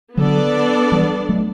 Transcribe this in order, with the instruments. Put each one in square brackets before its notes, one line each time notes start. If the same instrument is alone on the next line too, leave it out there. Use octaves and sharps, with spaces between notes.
[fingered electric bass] D3 F#3 [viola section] B3 D4 A4 D5
[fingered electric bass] E3 G3
F#3 A3